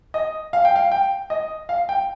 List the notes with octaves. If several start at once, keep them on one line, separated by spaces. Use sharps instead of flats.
D#5
F5
G5
F5
G5
D#5
F5
G5